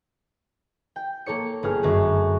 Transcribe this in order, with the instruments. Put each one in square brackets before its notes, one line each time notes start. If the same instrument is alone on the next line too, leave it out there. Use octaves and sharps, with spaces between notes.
[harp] G5
A#3 A4 C#5 C#7
G1 G#4 F6
F#2 D3 G#3 A3